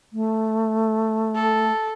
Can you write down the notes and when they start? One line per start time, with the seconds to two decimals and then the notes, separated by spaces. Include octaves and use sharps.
0.13 A3
1.35 A4